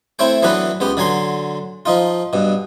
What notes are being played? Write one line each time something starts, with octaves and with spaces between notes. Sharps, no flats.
A3 C4 E4 C#5 G5
E3 F#3 B3 D4 A4 B4
C#2 B3 G4
D3 F#3 G#5 A#5 C6
F3 D#4 F4
G2 B2